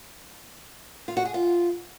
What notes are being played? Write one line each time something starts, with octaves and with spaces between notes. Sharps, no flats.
F4
F#4
G#4
F4